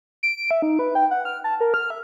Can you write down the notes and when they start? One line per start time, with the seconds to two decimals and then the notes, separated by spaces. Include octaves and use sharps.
0.23 D7
0.37 D7
0.51 E5
0.62 D#4
0.79 B4
0.95 G5
1.11 F#5
1.25 F6
1.44 A5
1.61 A#4
1.74 F6
1.90 E5